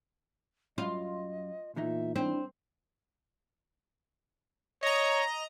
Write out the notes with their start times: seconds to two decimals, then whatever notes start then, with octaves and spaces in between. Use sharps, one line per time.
0.78 F#2 F4 D#5
1.76 E2 A#2 E3 D#4 E5
2.16 C4 D4 E4
4.83 C#5 D#5 A#5